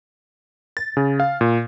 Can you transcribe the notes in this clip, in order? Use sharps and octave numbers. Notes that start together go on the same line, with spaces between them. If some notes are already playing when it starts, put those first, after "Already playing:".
A6
C#3
F5
A#2